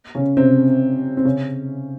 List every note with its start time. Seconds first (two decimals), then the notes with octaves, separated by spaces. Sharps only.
0.15 C#3 C#4
0.37 C3 C4
1.17 C4
1.25 C#3 C#4